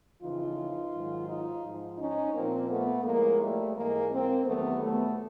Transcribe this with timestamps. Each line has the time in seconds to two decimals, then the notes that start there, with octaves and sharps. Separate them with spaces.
0.23 F2 C#3 E3 D#4 F4
0.94 G#2 D#3 F#3
1.29 D#4 F4
1.64 G#2 F3
1.99 C#4 D#4
2.34 A#2 F3 A#3 C4
2.70 A3 B3
3.05 A2 F3 G#3 A#3
3.40 G3 A3
3.75 G#2 E3 G#3 A#3
4.11 A#3 C4
4.46 E2 C3 D#3 F#3 A3 B3
4.81 A3 B3